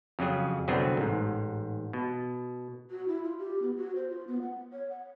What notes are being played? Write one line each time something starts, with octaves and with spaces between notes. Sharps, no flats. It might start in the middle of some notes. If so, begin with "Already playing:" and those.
F2 C#3 F#3 G#4
C2 D3 F#3 B3 C4 G#4
A1 G#2
B2
F#4
E4
F4
G4
B3
F#4
C5
F4
B3
F#5
C#5
F#5